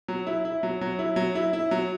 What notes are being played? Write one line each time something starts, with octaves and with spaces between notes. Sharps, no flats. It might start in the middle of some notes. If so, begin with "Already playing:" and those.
F#3
E4
E4
F#3
F#3
E4
F#3
E4
E4
F#3